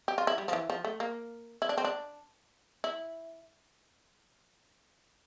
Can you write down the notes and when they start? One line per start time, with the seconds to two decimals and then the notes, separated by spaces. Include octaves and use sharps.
0.08 G4
0.18 F4
0.27 E4
0.38 G3
0.48 F3
0.53 E3
0.70 F3
0.85 A3
1.00 A#3
1.62 E4
1.69 D4
1.78 C4
1.85 D4
2.84 E4